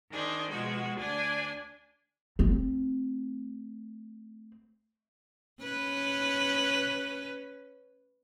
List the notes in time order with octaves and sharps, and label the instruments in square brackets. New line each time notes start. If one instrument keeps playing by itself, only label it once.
[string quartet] D#3 D4 G#4 C5
B2 F3 G#3 F#4
D2 D4 D5 G#5
[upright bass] A3 C4
[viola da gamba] C#4 B4